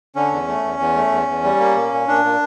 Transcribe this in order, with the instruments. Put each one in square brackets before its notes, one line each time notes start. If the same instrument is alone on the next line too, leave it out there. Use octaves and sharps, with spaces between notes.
[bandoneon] D3 C#4
E2
A3
E2
E2
A3
E2
E2
G3
A#3
A#2
A#2
A#2 D4
A#2